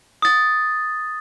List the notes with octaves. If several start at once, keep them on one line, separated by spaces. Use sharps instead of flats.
D#6 A6